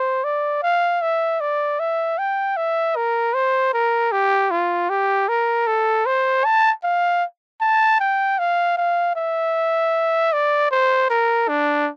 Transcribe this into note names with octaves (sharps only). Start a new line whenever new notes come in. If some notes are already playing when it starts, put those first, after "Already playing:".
Already playing: C5
D5
F5
E5
D5
E5
G5
E5
A#4
C5
A#4
G4
F4
G4
A#4
A4
C5
A5
F5
A5
G5
F5
F5
E5
D5
C5
A#4
D4